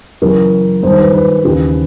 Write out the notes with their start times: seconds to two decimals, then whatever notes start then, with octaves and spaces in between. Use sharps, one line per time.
0.22 F#2 C#3 E3 A#4
0.83 G2 D#3 C5
0.98 B4
1.13 B4
1.45 D#2 C#3 E3